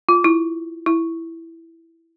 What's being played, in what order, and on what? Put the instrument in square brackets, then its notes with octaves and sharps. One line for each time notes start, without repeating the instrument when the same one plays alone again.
[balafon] F4
E4
E4